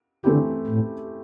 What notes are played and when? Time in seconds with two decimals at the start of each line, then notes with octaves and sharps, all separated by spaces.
0.24 D3 E3 A3 C4 E4 G4
0.67 A2